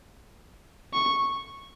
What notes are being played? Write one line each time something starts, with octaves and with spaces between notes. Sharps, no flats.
C#6